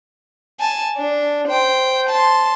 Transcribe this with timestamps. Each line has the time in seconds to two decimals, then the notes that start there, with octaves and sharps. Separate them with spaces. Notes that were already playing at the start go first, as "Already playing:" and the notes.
0.59 G#5 A5
0.97 D4
1.48 C5 G5
2.10 A5 C6